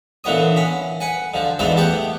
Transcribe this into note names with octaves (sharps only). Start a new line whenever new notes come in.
A#2 D3 E3 B3 C#5 D#6
C#4 B5
B4 F#5 G#5
D3 F3
G#2 E3 B3 F4 A4 D5
A3 B3 G4 F#5 G5